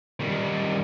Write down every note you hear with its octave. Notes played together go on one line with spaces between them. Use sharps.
D#3 G3